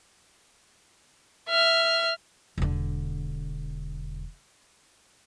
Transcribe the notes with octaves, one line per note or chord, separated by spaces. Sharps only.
E5 F6
E1 D3